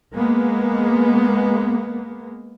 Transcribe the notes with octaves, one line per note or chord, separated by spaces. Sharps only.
G#3 A#3 B3